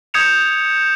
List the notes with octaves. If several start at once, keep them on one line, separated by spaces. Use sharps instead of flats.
D#6 G6 G#6 C#7 E7 F7